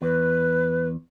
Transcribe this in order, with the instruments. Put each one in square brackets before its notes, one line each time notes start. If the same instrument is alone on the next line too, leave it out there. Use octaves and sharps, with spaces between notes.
[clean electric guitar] E2 [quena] B4